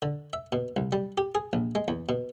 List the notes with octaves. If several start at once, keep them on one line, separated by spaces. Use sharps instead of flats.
D3
E5
B2
C2
G3
G4
G#4
A#1
G#3
E2
B2